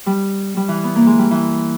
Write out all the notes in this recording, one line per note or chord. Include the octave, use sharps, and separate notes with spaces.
G3
G3
E3
B3
A#3
G#3
G3
E3